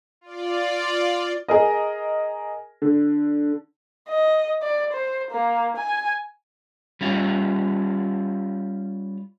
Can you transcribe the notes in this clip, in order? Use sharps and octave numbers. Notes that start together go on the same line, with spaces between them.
F4 D5
G#4 A#4 D#5
D3
D#5
D5
C5
A#3
G#5
G3 C#4 F4